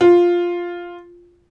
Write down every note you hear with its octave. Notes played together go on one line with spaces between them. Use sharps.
F4